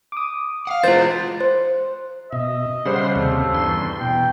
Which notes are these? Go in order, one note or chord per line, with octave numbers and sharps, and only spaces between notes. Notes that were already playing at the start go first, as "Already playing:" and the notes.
D6 D#6
F5 F#5
E3 G#3 B3 F4 C5 A6
C5
B2 D#5 E5
C#3 G3 C5 F#5 C6
D#2 C3 A4
E2 G2 C6
E2 B2 G5